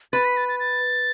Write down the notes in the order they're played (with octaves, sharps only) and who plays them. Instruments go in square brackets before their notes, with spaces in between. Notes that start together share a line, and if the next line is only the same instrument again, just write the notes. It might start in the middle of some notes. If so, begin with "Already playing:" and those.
[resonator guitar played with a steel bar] B4 [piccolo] A6
[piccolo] B6
A6
A6
A6